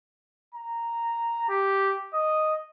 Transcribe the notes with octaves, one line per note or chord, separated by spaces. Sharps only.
A#5
G4
D#5